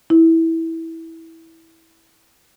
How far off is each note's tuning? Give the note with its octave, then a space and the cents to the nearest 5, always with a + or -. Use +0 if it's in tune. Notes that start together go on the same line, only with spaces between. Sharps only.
E4 -15